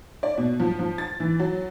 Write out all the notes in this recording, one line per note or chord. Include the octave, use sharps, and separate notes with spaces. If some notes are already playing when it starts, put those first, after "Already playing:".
D5
B2
F3
F3
A6
E3
F#3